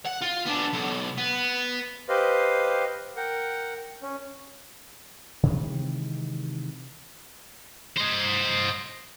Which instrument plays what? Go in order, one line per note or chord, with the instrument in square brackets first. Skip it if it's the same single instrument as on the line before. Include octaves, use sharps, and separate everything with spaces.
[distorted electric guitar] F#5
F4
B3 D4
B1
B3
[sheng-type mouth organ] G4 B4 C5 D#5 F5
A#4 F#5 G5
C#4
[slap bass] C3 D#3 E3 G#3
[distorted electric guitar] C5 D#5